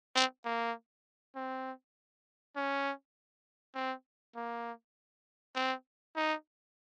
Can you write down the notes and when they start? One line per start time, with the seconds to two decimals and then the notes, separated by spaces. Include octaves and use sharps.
0.16 C4
0.45 A#3
1.36 C4
2.56 C#4
3.75 C4
4.36 A#3
5.55 C4
6.16 D#4